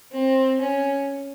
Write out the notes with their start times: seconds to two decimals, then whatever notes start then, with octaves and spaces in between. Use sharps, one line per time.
0.12 C4
0.60 C#4